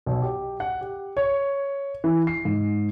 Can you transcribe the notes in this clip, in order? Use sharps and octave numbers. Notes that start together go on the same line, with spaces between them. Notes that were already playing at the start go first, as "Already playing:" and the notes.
B1
G4
F#5
G4
C#5
E3
C7
G#2